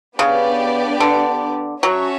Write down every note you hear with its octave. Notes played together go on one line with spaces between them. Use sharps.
C#3 B3 D4 G4 D5
D3
F#3 C#4 F#4 C#5 E5 A5